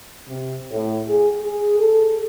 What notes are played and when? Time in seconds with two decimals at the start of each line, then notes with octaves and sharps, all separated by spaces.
0.28 C3
0.71 A2
1.09 G#4
1.41 G#4
1.79 A4